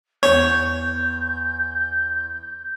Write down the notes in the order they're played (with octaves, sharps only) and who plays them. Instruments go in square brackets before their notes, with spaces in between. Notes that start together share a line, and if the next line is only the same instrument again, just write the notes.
[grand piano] E2 [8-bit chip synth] C#5 [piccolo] G6